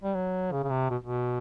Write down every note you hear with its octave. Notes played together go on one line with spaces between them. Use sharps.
G3
F#3
C#3
C#3
C3
B2
B2